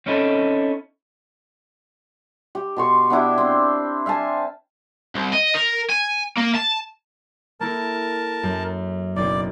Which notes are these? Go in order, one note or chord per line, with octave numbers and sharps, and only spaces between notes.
C4 C#4 D#4 E4 A4
G4
B2 C6 C#6
B3 D4 E4 G4
C4
E5 F5 G#5 A5
C2
D#5
A#4
G#5
A#3
A5
A#3 E4 A4 A#4 A5
F#2
F#1 B1 D5